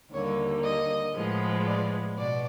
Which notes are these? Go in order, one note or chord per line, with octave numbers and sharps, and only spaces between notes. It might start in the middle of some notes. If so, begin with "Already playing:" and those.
D#2 D3 G3 A#3 C#5
D#5
A2 F3 G#3 B3
D5
B2 D5